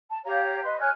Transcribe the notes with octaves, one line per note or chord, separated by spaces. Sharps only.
A5
G4 C#5 F5 A#5
B4 D#5 C6
C#5 G#5 F6 F#6